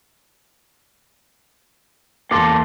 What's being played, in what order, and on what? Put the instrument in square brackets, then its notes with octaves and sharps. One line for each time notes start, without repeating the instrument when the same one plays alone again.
[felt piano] E2 C6 D6 [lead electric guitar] A#3 A4